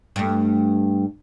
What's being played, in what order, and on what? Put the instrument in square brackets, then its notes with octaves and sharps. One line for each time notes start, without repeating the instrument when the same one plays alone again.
[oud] G2 A3